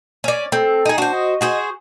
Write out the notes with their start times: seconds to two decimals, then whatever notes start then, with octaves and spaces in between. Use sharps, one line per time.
0.24 C#4 D5
0.52 C4 A4
0.86 D#4 G#4
0.98 D4 F#4 C5
1.13 D#5
1.41 F#4 G#4 C5